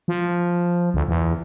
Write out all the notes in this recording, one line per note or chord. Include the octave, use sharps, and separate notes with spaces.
F3
D2
E2